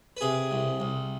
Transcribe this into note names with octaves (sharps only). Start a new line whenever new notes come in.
B4
C3 G#4
C2
C2